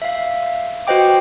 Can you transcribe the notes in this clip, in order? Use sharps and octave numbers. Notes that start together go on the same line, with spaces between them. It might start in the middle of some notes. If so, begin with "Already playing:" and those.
E5 F5
F#4 B4 C5 D#5 G5 D6